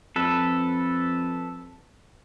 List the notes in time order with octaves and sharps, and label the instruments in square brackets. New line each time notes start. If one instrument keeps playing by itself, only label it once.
[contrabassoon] F2 [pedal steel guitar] A4 B4